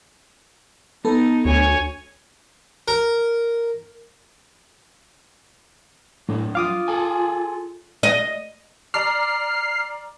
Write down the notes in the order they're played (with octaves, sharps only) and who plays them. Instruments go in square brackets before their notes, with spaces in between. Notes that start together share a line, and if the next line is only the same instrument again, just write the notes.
[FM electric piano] B3 A4 [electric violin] D#4
[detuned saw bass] D2 [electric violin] C#5 G#5
[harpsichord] A#4
[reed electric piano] A2 [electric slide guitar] F#3 D4
[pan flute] F4 [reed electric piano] F5 D6 D#6
[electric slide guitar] G#4 A4 G#5
[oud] D#5
[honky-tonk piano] D5 A#5 D6 [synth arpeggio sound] F6 C7